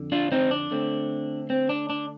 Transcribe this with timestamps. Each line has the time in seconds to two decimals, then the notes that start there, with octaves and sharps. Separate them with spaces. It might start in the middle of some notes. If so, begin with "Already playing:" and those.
Already playing: F2 D3
0.12 D4 F4
0.32 C4 D#4
0.51 D4
0.71 D3 A3 C4
1.50 C4
1.69 D4
1.90 D4